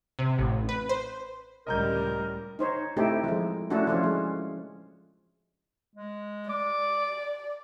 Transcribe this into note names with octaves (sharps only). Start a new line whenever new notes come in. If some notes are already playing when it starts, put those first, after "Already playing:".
C3
A1
B4
C5
C#2 A2 G3 A#4 D#5 A#5 G6
D#4 C5 C#5
A3 C4 D#4 E4 G4 A4
F3 G#3
A3 C#4 D4 E4 F#4 A4
F3 C#4 F4
G#3
G#3
D5 D6